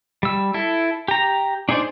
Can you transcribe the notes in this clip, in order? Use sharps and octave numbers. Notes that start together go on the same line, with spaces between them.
G3 E6
E4 A4
G4 A#5
D4 D#4 G#4 C5 D5